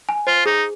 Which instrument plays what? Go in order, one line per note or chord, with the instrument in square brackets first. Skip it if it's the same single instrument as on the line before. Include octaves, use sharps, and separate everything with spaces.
[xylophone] G#5
[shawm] F4 [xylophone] C5
[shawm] D#4 [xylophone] G#4